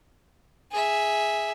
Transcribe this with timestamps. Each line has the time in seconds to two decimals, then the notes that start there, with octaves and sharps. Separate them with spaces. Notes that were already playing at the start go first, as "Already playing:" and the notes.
0.72 G#4 E5